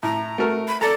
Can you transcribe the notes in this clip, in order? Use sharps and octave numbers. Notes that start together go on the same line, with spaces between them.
A2 A#5
A3 F#4 A#4
B5
A4 D5 A#5